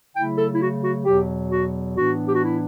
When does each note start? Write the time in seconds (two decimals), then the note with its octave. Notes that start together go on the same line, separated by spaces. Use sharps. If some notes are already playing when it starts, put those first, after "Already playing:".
0.14 C#3 F#3 A3 E4 G5
0.37 A4
0.52 E4
0.60 F#4
0.83 F#4
1.05 E2 B2 F#3 G4
1.50 F#4
1.96 A2 E3 B3 D4 F#4
2.27 G4
2.34 F#4
2.42 E4